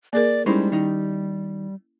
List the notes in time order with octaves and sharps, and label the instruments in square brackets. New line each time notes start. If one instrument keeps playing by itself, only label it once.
[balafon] A#3 G#4 A#4 [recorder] D5
[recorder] G3 [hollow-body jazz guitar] G#3 D#4 C5 [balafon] C#4 E4
[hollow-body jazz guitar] D#3 D#4